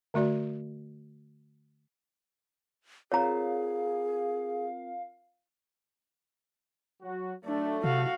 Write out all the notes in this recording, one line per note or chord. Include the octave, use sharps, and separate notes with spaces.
D3 A3 F#4 D5
C4 F4 G#4 A#4 C#5 F5 A#5
F#3 F#4
F#3 A3 D4
C3 F#4 F5